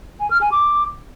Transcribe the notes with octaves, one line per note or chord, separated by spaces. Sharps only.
G#5
F6
G#5
D6